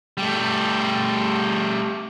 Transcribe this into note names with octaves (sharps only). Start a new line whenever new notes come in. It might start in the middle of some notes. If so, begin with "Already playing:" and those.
G3 A3